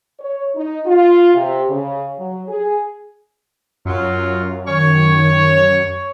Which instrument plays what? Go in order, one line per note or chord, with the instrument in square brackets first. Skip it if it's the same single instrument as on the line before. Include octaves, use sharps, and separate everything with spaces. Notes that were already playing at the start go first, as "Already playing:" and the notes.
[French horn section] C#5
D#4
F4
C3
C#3
F#3
G#4
[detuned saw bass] F#2 [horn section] F#3 F4
[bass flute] D#3 [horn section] C#5